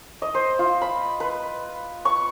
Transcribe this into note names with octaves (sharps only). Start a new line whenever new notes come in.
D#5
C5
F4
B5
B4
C#6